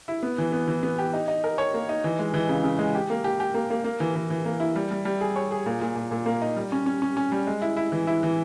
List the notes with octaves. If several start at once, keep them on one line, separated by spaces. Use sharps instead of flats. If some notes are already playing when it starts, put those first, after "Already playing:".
E4
B3
E3
B3
E3
B3
G4
D#4
D#4
A#4
C#5
A#3
D#4
E3
G#3
E3
C#3
C#3
G#3
G4
A#3
G4
G4
A#3
A#3
A#3
E3
E3
E3
A#3
E4
G3
G3
G3
G#4
C#5
G#4
A#2
A#2
A#2
A#2
A#3
D#4
G3
C#4
C#4
C#4
C#4
G3
G#3
E4
E4
E3
E4
E3